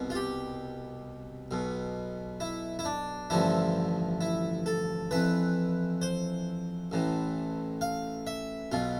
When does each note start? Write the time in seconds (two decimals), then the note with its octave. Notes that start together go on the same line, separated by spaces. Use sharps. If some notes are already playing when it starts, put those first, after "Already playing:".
Already playing: C2 B2
0.10 F4
0.15 G4
1.51 B1 B2
2.40 E4
2.79 E4
2.85 D4
3.30 A1 G2 D3 F3 E4
4.21 E4
4.66 A4
5.11 F2 E3 B4
6.02 C5
6.92 A1 A2 E3
7.81 F5
8.27 E5
8.72 B1 B2 F4